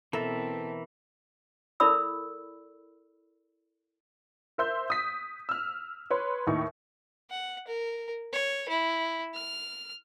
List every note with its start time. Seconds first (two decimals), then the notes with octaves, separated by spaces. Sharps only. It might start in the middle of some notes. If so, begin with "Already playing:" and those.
0.13 B2 E3 C4 A4 A#4 E5
1.80 E4 A4 A#4 D5 B5 E6
4.58 A#4 C5 E5 C6 E6 G6
4.90 D#6 B6
5.49 E6 F6
6.10 B4 C#5 C6
6.47 D#2 A2 D#4 C#6
7.31 F#5
7.67 A#4
8.33 C#5
8.69 E4
9.35 F6